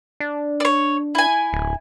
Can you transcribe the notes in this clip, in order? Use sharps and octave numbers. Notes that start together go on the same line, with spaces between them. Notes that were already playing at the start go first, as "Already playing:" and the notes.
D4
C#5 D5
E4 G#5
D1